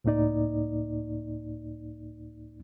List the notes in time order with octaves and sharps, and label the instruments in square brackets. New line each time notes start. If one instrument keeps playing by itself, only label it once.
[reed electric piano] C#2 A2 A#3 D#4 D5